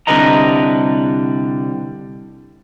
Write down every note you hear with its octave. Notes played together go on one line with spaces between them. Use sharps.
C2 D3 G3 B4 D#5 A#5